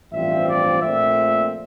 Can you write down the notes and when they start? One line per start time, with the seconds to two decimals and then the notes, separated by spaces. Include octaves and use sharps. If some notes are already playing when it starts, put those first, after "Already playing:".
0.12 A1 G2 F3 C4 E5
0.47 D5
0.82 A#1 A#2 A3 C4 E5